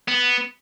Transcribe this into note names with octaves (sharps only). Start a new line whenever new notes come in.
B3